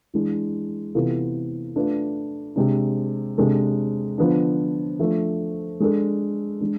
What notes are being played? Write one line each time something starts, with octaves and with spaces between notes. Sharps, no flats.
E3 G#3 D4
C3 E3 B3 F4 A4
A3 D4 F4 B4
C3 G#3 D4
C3 G#3 D4 A4
D3 F3 B3 D4
F3 A3 D4
G#3 D4 A4
G#3 D4